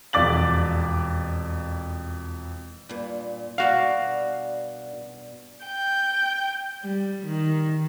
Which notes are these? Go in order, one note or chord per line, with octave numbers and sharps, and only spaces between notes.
E1 F2 D5 D6 A6 F#7
G2 A#2
G2 B2 F#4 D5 F5
G5 G6
G3
D#3